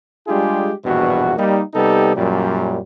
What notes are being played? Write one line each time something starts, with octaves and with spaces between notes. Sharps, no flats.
G3 G#3 D4 F4 G4 G#4
A#1 E2 G2 B2 F#4
G3 A#3 D#4
C3 G3 B3 D#4 G4 A4
F#2 A#2 G3